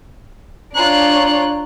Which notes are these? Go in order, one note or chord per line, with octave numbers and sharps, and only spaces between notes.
D4 F4 C#5 A#5 F#6